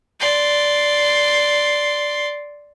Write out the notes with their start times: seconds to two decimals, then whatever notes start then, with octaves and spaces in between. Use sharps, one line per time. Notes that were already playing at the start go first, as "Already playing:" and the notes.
0.20 D5 C6